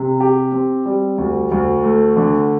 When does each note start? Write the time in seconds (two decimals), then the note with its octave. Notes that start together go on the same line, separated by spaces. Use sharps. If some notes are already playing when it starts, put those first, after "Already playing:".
Already playing: C3
0.20 G4
0.52 C4
0.86 G3
1.18 D2
1.51 D2
1.84 A3
2.16 D3